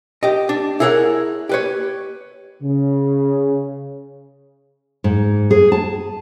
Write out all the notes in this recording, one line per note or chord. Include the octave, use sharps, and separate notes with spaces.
G4 D#5
D4
E4 G#4 A#4 C#5 F5 F#5
G4 B4 C#5
C#3
G#2
G#4
A5